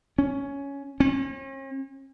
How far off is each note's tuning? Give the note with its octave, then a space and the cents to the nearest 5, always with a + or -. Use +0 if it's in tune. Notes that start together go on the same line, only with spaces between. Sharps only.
C#4 +10
C#4 -45